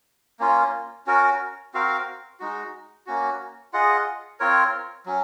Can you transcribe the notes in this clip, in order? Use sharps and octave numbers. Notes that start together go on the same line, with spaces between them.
A#3 C#4 F4
C#4 F#4 A#4
C4 F#4 A#4 F5
G#3 D#4 F#4
A#3 C#4 F#4
F4 G#4 D#5 F#5
C4 F4 A#4 C#5
F#3 C#4